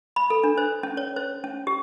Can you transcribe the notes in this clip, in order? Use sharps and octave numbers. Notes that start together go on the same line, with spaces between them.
B5
A4
D4
C5
C#4
C#5
C5
C#4
G4